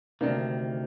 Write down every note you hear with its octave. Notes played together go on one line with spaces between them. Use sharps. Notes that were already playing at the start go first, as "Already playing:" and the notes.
D2 C3 D#3 A#3 D4